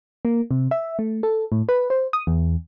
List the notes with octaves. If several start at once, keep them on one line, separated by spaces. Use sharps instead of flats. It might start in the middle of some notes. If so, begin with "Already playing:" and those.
A#3
C3
E5
A3
A4
A2
B4
C5
D#6
E2